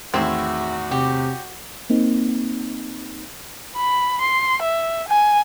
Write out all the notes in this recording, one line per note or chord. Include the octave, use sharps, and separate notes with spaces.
E2 A2 D#3 C4 E4 F#4
C3 G4
A#3 C4 D#4
B5
C6
E5
G#5